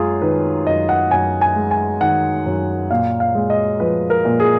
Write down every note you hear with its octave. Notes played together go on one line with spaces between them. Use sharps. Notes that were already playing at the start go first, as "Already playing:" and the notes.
Already playing: F#2 G#3 F4 G#4
D#3 B4
F#2 D#5
F#5
F#2 G#5
G#5
G#3
G#5
D#3 F#5
F#2
A#2 F5
F5
G#3
D#5
F3 B4
A#4
A#2
G#4